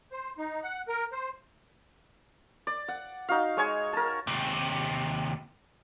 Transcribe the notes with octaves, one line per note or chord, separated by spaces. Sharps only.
C5
D#4
F#5
A#4
C5
D5
F#5
D#4 F#4 F5
G#3 C#5 G#5 C#6
A#4 A5
D#2 C3